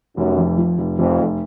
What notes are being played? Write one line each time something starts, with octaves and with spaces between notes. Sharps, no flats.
F1 F#2
F2
F3
F1
F1 F2
F1